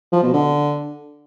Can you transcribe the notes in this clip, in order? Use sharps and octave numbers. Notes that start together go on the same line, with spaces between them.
F3
B2
D3